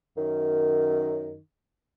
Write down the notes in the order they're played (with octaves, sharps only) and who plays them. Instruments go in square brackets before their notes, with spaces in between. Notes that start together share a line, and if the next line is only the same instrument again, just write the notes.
[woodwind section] F#2 D#3